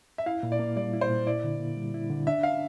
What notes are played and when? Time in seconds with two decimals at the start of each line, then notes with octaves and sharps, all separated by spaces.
0.18 E5
0.26 E4 F5
0.43 A#2
0.52 D5
0.59 A#3
0.76 G3 D5
0.93 E4
1.01 C5
1.09 A#2
1.27 E4 D5
1.44 D3
1.59 A#3
1.77 G3
1.94 E4
2.10 D3
2.27 D4 E5
2.43 F5